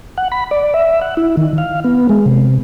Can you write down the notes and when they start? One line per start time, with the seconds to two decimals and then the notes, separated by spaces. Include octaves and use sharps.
0.17 F#5
0.32 B5
0.51 D5
0.74 E5
1.02 F#5
1.17 E4
1.37 D#3
1.58 F5
1.84 B3
2.09 G#3
2.26 C3